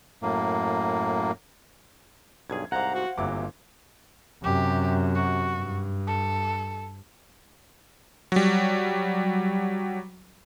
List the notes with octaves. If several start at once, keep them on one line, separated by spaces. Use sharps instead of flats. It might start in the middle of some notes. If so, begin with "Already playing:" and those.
F#2 A2 A#3
B1 G2 G#4 G#6
C2 G#2 C5 F5 F#5 A#5
F#4
G1 C3 E3 F#3 A#3 D6
F#2 C3 G4
F#4
G2
A4
F#3 G3